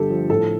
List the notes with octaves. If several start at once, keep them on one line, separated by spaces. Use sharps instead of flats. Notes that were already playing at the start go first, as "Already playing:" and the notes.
Already playing: G1 G2 D3 G4 A4
F3
A2 A4